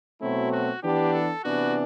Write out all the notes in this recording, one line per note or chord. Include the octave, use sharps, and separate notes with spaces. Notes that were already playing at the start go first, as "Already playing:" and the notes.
B2 F#3 A3 C4 E4
F#4
E3 B3 D4 G4
A4
C3 E3 B3 D4 F#4